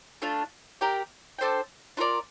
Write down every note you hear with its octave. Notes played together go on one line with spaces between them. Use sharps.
A3 D4 F4
G4 A#4 D5 G5
D4 A4 C5 G5
D4 F4 A#4 D5